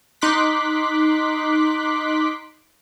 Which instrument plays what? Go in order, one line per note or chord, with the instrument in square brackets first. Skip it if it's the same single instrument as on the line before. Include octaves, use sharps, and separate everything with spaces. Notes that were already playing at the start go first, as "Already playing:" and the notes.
[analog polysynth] D#4 C6 D6 F#6 B6